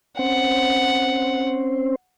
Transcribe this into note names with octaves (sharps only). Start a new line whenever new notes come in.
C4 C#4 C5 F#5